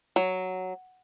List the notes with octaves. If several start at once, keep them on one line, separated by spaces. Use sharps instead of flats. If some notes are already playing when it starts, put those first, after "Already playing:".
F#3